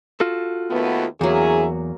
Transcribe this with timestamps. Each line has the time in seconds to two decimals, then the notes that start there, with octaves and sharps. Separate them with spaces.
0.20 F4 F#4 A4
0.70 D#2 A3 B3
1.21 E2 F#3 A#3 C#4 E4 G#4